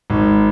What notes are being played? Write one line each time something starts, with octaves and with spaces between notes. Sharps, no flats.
G#1